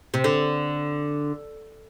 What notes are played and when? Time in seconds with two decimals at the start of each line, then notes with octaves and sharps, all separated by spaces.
0.14 C3
0.24 D3